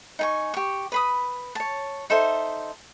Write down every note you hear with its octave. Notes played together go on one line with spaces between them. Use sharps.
D#4 G#5 C#6
G4 C#6
B4 B5 D#6
C#5 A5
D#4 A4 C5 E5